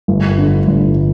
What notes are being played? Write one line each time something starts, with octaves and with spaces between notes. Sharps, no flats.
G1
D3
G1